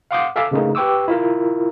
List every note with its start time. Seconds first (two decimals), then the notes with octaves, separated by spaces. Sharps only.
0.11 F5 F#5 C6 D6 D#6 G6
0.36 A4 E5 F5 G#5 A5 D6
0.51 C#3 E3 A3 A#3 D#4 G#4
0.75 G4 B4 G5 C#6 D6 E6
1.08 E4 F4 A#4